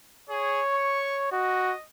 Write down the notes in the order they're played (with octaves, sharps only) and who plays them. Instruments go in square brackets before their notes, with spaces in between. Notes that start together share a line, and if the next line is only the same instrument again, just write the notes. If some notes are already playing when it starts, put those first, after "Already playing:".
[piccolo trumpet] G#4 [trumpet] C#5
[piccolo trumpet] C#6
[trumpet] F#4 [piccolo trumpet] D#5